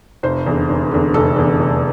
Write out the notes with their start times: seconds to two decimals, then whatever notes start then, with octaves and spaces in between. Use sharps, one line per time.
0.23 F1 C5
0.46 E2 D3
0.69 F1
0.91 E2 D3
1.14 F1 A4
1.36 E2 D3
1.59 F1